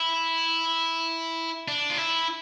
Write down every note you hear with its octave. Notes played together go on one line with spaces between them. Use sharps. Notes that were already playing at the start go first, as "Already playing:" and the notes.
Already playing: E4
D4
F4
E4